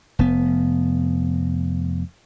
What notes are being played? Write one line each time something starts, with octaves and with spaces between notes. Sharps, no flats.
F1 B3